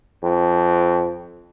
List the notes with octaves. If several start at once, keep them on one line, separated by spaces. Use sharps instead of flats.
F2